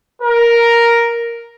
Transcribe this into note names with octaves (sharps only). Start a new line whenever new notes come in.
A#4